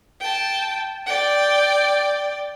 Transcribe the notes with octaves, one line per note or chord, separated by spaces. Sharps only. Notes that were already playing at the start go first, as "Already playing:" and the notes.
G5 A5
D5 G5